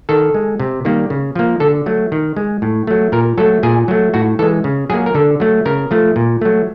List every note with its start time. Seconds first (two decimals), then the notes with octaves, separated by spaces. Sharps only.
0.09 D#3 A4
0.34 G#3
0.60 C3
0.85 D#3 G3 A#3
1.10 C#3
1.35 F3 A#3
1.60 D3 A4
1.86 F#3 A3
2.12 D#3
2.36 G#3
2.62 A2
2.87 F#3 A3
3.12 A#2 A#4
3.38 F#3 A3 A4
3.63 A#2 G#4
3.88 F#3 A3
4.14 A2 F#4
4.39 E3 A4
4.43 G#3
4.64 C#3
4.90 F#3 G#4
4.94 A#3
5.06 A#4
5.15 D3 A4
5.40 F#3 A3
5.65 C#3 A#4
5.91 F3 A3
6.16 A#2
6.41 F#3 A3